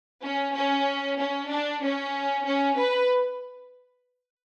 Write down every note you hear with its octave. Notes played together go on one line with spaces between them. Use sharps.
C#4
C#4
C#4
D4
C#4
C#4
B4